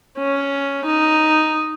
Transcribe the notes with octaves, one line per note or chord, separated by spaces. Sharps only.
C#4
D#4